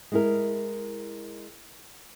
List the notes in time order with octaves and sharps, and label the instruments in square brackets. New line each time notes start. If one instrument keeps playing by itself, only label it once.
[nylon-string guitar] G#3 E4 A#4